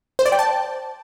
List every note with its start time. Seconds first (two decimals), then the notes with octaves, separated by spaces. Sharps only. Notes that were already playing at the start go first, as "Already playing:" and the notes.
0.19 C5
0.26 D5
0.32 G5
0.39 A5